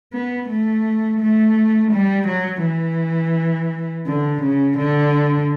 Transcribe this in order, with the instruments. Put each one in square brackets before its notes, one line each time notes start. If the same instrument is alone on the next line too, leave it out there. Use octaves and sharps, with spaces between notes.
[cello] B3
A3
A3
G3
F#3
E3
D3
C#3
D3